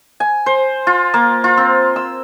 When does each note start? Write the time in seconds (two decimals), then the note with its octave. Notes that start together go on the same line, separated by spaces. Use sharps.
0.20 G#5
0.46 C5
0.87 F4
1.14 A#3
1.44 F4
1.57 C4
1.96 E6